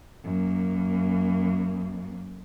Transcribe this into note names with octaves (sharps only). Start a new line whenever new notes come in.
F#2 A#3